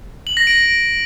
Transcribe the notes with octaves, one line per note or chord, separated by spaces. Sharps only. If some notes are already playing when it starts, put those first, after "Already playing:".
F#7
A#6
D7